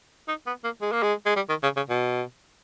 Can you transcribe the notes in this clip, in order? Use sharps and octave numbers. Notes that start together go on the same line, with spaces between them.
D#4
B3
A#3
G#3
A#3
G#3
G#3
G3
D#3
C#3
C#3
B2